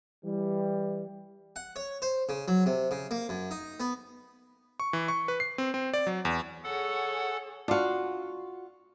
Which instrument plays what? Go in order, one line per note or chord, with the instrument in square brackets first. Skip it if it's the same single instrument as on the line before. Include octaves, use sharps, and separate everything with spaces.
[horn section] E3 G3
[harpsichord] F#5
C#5
C5
C#3
F#3
C3
C#3
A#3
F#2
D#4
B3
[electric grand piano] C#6
E3
C#6
B4
C7
C4
C4
D5
F#3
E2
[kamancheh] G#4 C#5 [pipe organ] A4 F#5
[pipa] D4 F5 [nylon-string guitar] F4 F#4